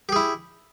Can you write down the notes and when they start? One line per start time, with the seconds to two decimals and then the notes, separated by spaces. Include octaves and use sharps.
0.09 G4
0.12 G#4
0.16 E4